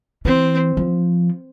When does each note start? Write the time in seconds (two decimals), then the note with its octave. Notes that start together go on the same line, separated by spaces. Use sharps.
0.25 E3 C4
0.77 F3